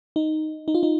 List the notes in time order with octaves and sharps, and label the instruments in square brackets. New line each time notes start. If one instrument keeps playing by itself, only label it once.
[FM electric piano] D#4
D#4
F4
D#4